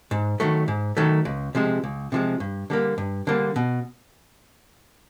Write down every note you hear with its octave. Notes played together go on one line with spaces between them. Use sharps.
G#2
D#3 F#3 A3
G#2
D#3 F#3 A3
C#2
C3 F3 G#3
C#2
C3 F3 G#3
G2
D3 G3 A#3
G2
D3 G3 A#3
B2